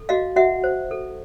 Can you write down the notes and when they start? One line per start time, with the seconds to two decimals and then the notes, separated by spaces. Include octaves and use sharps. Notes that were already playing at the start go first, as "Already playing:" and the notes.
Already playing: A4
0.09 F#4 D#5 F5
0.36 F#4 E5 F#5
0.64 C5
0.91 A4